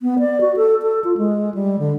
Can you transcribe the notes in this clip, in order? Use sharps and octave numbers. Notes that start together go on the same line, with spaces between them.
B3
D5
F#4
A4
A4
F4
G#3
G3
D3